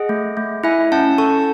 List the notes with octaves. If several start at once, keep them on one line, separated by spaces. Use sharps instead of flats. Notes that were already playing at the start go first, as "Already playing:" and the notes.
Already playing: G#4 D#5 F#5
A3
A3
E4 E5 G#5
C#4 F#5 A5
A4 A5 C#6